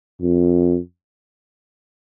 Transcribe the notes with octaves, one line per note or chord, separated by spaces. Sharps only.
F2